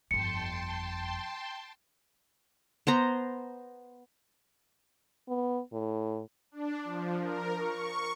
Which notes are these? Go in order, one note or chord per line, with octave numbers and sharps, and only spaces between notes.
G1 F2 G5 A5 C6 C#7
B3 C5 A#5
B3
A2
D4
F3
A#4
C#6